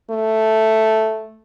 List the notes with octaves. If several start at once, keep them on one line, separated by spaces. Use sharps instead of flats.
A3